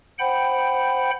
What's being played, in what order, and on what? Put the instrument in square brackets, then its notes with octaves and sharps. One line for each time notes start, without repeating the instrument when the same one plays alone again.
[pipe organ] C5 F#5 G5 B5